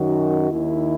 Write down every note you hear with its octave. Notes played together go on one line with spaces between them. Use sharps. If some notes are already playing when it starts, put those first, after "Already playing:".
Already playing: F#2 D#3 F#4
D#2 D#3 E4